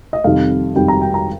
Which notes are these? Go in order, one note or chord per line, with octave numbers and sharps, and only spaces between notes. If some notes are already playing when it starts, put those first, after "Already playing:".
D#5
F2 C3 D#3 G3 F5
F2 C3 D#3 G3 G5
A#5
G5
A#5